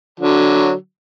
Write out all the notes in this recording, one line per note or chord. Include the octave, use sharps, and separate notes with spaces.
D3 F#3